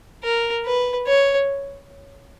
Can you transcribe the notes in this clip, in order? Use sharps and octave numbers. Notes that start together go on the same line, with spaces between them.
A#4
B4
C#5